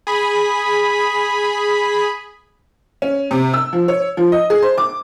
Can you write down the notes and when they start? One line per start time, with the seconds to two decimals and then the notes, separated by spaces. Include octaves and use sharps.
0.07 G#4 B5
3.02 C#4
3.31 C3
3.54 E6
3.73 F3
3.88 C#5
4.17 F3
4.32 D#5
4.50 G#4
4.62 C5
4.78 D6